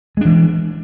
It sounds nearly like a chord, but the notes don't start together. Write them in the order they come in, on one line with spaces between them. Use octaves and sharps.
G#3 D4 E3